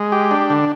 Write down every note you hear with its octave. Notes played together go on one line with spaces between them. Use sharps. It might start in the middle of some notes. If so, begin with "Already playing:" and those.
Already playing: G#3
G4
D4
D3